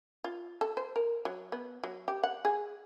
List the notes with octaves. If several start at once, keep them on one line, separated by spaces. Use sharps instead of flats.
F4
A4
C5
A#4
F#3
B3
F#3
G4
F#5
G#4